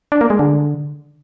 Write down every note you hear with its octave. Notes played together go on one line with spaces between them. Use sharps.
D4
A#3
G#3
D3